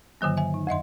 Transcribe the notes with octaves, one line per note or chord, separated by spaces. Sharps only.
G2 D3 D#3 F#3 A#3
E5 G#5
D#4
F2 D#5 E5 C6